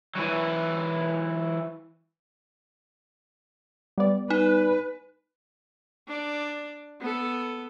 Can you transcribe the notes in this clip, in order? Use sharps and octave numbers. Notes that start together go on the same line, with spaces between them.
E3 F#3
G3 B3 D5
D#4 B4
D4 D5
B3 A4